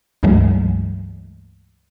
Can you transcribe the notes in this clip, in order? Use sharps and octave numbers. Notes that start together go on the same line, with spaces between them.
C#2 G2 E3 F#3 G#3 A3